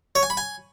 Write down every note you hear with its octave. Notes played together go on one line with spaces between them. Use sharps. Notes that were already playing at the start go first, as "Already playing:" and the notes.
C#5
G#5
B5
G#5